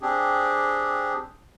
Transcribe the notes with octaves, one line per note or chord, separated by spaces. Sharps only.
C4 D4 G4 G#4